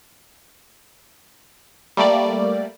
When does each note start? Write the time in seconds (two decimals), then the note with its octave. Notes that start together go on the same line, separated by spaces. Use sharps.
1.97 G3 A3 A#3 D5